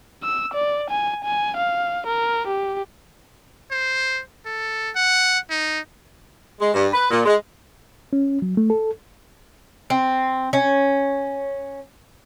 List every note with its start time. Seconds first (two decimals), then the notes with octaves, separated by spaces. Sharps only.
0.23 E6
0.54 D5
0.90 G#5
1.24 G#5
1.57 F5
2.07 A#4
2.47 G4
3.71 C5
4.46 A4
4.96 F#5
5.50 D#4
6.60 G#3
6.74 G2
6.94 B4
7.11 A#2
7.25 G#3
8.13 C#4
8.42 F#3
8.57 A3
8.70 A4
9.90 C4
10.53 C#4